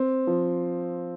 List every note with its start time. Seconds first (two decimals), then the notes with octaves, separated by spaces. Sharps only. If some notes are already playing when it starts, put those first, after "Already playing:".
Already playing: C4
0.27 F3